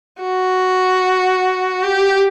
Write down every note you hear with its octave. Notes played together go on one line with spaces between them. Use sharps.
F#4
G4